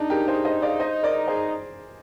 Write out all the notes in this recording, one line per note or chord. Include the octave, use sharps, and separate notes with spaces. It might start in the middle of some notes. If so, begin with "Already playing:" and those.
Already playing: D4 D#4
G4 A#4
G#4 C5
C5 D#5
D5 F5
C5 D#5
A#4 D5
G#4 C5